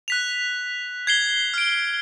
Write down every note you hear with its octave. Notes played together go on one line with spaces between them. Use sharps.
F#6 B6 F7
G#6 C7 G7
F6 D7